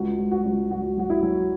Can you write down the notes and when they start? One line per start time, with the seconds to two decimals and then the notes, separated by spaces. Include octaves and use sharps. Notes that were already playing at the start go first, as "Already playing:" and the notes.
Already playing: C#2 F#4
0.19 C#2
0.31 F#4
0.45 C#2
0.71 C#2 F#4
0.97 F#3 F#4
1.10 E4
1.23 F#3